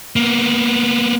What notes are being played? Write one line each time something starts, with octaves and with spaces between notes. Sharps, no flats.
A#3 B3